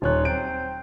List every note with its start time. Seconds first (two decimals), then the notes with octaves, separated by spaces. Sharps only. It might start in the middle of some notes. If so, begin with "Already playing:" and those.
0.02 D#1 D#4 F4 C#5 F#6
0.25 F#3 C4 C5 D7